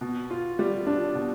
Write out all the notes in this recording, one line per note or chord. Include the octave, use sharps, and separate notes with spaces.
B2
F4
G3
D4
B2